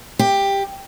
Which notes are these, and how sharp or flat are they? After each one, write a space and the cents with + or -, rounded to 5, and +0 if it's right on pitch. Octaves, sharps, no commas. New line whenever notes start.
G4 +10